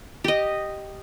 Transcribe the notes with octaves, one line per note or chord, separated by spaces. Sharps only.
G4 D#5